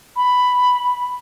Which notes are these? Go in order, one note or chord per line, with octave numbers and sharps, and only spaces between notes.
B5